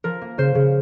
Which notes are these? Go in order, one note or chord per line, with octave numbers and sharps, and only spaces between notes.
F3 A#4
A#3
C#3 C5
C#3